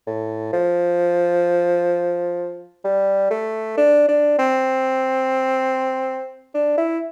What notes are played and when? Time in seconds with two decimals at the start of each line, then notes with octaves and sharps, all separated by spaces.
0.07 A2
0.53 F3
2.85 G3
3.31 A3
3.77 D4
4.09 D4
4.39 C4
6.55 D4
6.78 E4